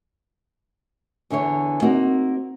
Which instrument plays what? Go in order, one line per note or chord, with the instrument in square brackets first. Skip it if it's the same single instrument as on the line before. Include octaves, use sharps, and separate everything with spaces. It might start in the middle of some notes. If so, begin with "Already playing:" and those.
[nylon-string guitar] E2 D3 E3 C#5
A#3 C4 D#4 F#4